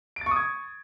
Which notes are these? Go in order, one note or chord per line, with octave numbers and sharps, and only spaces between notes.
C#6 D#6 G#6 A6 D7